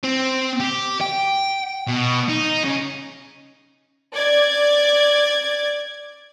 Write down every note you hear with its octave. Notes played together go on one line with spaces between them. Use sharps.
C4
G4
G5
B2
D#4
C#3
D5 G#6